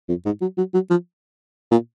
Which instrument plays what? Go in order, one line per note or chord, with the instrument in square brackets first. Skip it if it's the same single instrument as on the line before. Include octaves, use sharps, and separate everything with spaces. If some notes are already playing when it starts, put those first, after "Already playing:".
[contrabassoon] F2
G#2
F#3
F#3
F#3
F3
A#2